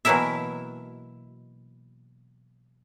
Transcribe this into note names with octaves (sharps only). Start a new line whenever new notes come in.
B2 E3 F#3 A#3 E4 E5